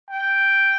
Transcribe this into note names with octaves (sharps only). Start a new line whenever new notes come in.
G5